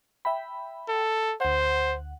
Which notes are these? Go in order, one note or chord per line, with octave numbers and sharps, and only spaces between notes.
E5 G5 B5
A4
D2 C5 F#5